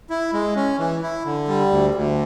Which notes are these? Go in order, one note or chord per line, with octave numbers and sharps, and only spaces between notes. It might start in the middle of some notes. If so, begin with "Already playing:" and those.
E4
G#3
C#4
E3
E4
D3
G3
D2
D2